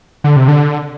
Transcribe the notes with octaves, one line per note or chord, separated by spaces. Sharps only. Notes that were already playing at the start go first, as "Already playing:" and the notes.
D3
C3
D3